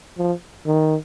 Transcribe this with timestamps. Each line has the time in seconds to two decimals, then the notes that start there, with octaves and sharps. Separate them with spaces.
0.18 F3
0.66 D#3